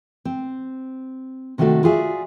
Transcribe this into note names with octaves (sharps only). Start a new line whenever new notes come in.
C4
C3 D#3 G3 A3 F#4 A4
F4 F#4 G#4 D5 E5